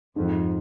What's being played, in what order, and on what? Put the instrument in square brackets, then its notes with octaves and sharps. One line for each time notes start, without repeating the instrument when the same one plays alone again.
[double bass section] F2 [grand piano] G#2